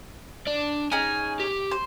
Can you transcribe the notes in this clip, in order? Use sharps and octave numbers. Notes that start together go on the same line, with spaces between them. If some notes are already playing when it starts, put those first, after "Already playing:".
D4 D5
C#4 D#4 G#4 G#5
G4
C5